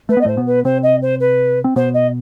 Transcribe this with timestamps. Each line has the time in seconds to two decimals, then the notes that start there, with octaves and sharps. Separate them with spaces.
0.09 A3 B4
0.17 B3
0.21 D#5
0.25 A2 A3 C5
0.37 B2 B3
0.47 B4
0.65 C3 C4 C5
0.83 D#5
1.02 C5
1.20 B4
1.64 C4
1.76 B2 B3 C5
1.94 D#5